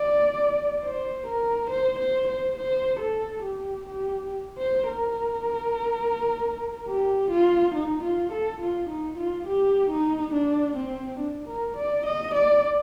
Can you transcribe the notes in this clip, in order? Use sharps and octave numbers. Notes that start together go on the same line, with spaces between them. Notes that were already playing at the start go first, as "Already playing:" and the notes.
Already playing: D5
C5
A#4
C5
C5
C5
C5
A4
G4
G4
C5
A#4
G4
F4
D#4
F4
A4
F4
D#4
F4
G4
D#4
D4
C4
D4
A#4
D5
D#5
D5